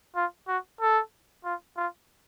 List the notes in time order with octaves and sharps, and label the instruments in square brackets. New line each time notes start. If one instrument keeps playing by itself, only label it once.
[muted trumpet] F4
F#4
A4
F4
F4